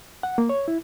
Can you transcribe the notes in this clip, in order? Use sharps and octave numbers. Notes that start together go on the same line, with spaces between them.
F#5
A#3
C#5
E4